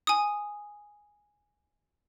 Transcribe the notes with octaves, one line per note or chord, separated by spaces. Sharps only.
G#5 D#6